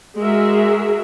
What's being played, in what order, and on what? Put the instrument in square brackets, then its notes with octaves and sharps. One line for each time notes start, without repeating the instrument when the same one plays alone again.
[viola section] G#3 F#4 G#4 A#4 E5